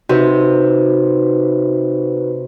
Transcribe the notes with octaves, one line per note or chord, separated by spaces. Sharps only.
C3 D#4 F#4 B4